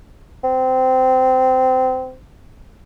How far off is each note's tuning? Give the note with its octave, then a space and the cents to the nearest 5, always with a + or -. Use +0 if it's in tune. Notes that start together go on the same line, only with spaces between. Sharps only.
C4 -20